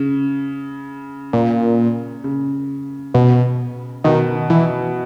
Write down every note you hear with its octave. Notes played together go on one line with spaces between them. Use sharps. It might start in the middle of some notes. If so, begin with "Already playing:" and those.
Already playing: C#3
A#2
C#3
B2
B2 D#3
E3